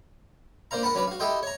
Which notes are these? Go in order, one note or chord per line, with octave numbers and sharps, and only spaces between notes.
A#3 D4 C5 F5 A#5
A#4 F#5 A5 B5
F#3 C#4 D4 B4 D5
F#4 F5
E4 G4 A4 D#5 G5 C6
C#5 A#5